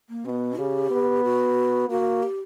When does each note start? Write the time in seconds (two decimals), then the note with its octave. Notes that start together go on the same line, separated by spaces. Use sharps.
0.10 A#3
0.25 B2 C#4
0.29 B3
0.58 C#3 G4
0.91 B3
1.24 F#4
1.89 A#3 F#4
2.23 G4